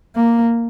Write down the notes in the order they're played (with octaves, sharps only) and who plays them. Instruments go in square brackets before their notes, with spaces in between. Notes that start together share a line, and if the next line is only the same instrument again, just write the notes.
[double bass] A#3